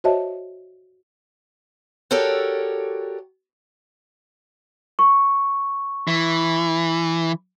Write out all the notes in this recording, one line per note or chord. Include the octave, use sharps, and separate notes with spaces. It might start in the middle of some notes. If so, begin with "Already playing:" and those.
F#4 C5 C#5 D#5 E5 A5
F#4 G4 A4 A#4 C#5 D5
C#6
E3